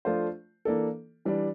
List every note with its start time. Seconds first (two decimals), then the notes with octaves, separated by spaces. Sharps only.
0.05 F3 A3 D4 F4 C5
0.65 E3 A#3 D4 A4
1.25 E3 G3 D4